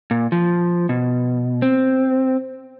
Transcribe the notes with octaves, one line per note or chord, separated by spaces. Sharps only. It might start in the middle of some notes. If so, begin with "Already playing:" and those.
A#2
F3
B2
C4